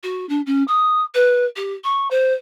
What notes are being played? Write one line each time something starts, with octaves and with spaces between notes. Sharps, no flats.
F#4
D4
C#4
D#6
B4
G4
C#6
C5